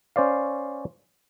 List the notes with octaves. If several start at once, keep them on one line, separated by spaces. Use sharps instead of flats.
C#4 C5 D5 F5